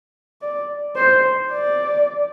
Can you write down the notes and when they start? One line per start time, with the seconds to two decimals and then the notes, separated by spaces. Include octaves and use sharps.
0.41 D5
0.95 C5
1.51 D5